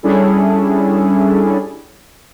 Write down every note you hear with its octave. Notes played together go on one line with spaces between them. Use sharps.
G3 C#4 D4 E4 G#4 A4